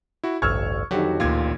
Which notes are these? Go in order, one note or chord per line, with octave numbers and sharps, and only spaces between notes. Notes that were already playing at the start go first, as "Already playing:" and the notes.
E4 F#4
A1 D2 G2 C#6 E6 F6 G#6
F2 D3 D#3 F#3 F#4 G4
A1 D2 A#2 F4 G#6